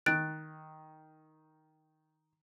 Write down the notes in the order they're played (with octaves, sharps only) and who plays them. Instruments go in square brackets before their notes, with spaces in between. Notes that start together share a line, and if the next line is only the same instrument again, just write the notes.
[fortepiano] D#3 [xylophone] F#6 A6 D7